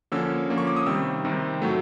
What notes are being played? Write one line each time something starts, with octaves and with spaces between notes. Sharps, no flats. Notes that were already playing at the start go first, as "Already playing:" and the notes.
D3 F3 A#3 C#4 E6
D3 F3 A#3 C#4
C#6
D6
D#6
C3 D#3 G3 C4 E6
C3 D#3 G3 C4
A2 F#3 A3